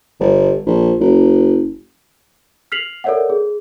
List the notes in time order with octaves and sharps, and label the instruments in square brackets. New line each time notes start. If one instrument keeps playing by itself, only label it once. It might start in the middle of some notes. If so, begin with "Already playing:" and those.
[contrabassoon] G1
A#1
F#1
[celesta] F6 B6 C7 F7 F#7
A4 A#4 C#5 D5 E5 F#5
G#4